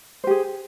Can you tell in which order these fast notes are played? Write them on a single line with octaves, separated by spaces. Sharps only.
C5 G4 G#4